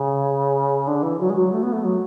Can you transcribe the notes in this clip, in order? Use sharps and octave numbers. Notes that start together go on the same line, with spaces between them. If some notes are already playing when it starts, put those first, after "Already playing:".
Already playing: C#3
D3
E3
F#3
G#3
F#3
A3
B3
A3
F#3